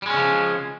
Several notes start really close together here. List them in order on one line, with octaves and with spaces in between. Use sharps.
G3 G#3 C#4 C#3 F3